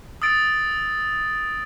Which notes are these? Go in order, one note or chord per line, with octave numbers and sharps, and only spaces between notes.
D#6 E6 A6 D7